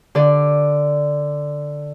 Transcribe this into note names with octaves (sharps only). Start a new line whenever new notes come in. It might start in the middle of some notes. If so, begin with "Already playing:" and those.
D3 D5